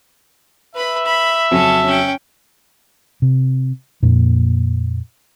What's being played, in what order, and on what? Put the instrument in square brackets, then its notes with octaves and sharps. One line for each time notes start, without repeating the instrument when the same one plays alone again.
[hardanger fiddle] B4 B5 [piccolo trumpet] E5
[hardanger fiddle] B5
[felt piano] F2 C#3 F#3 [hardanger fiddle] C#4 A5
[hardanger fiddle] C#4 G5
[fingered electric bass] C3
F2 A#2 A#3